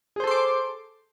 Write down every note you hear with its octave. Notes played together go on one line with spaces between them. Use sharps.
G#4 A4 C5 C6 D6